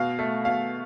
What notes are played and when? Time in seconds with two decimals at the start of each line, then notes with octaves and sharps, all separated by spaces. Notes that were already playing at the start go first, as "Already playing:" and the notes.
Already playing: B2 F5
0.19 A3
0.45 B2 F5